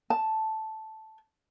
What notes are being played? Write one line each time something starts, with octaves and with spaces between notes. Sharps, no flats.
A5